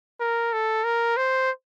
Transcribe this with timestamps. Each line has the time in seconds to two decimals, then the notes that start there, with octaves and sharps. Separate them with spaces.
0.20 A#4
0.53 A4
0.84 A#4
1.17 C5